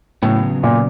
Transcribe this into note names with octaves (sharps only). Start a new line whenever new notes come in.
A2 C#3 F#3 B3
A#2